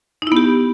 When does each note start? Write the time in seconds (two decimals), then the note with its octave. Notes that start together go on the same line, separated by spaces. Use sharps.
0.22 D#4
0.27 E4
0.32 B3
0.37 G4